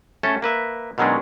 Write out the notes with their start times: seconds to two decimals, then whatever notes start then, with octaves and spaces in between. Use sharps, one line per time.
0.23 A3 C#4 A4
0.42 A#3 B4 E5
0.98 B2 D#3 F#3 G#3 C#4 D4